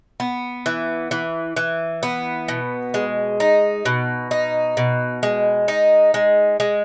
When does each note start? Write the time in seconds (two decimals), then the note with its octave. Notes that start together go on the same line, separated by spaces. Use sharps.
0.20 B3
0.66 E3
1.11 E3
1.57 E3
2.03 B3
2.48 B2
2.94 G#3
3.40 D#4
3.85 B2
4.31 D#4
4.77 B2
5.23 G#3
5.68 D#4
6.14 G#3
6.60 G#3